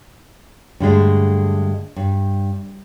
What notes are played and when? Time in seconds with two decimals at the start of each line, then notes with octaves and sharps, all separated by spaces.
0.80 G2 D3 G#3 A3
1.96 G2